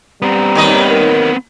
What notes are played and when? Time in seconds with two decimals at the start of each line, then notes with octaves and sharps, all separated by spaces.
0.22 G3 B3 C4 A#5
0.55 D#2 D#3 D#5
0.89 A#4